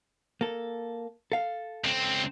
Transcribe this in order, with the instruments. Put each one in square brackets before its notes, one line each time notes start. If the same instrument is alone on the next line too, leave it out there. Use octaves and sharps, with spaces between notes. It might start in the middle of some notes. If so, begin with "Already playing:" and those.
[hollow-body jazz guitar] A#3 A4
A4 F5
[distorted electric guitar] C#2 C4